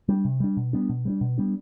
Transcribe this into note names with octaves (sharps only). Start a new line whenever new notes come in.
G3 D4
C3
G3 D4
B2
G3 B3 D4
B2
G3 B3 D4
B2
G3 B3 D4